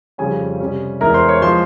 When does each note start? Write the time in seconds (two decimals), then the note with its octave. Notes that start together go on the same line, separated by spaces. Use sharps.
0.18 F2 C#3 G3 C#4 G#4 G#5
0.60 C3 G3 C#4
1.00 E2 E3 G#3 E4 A#4 A#5
1.14 C5 C6
1.28 C#5 C#6
1.42 F3 G#3 C5 C6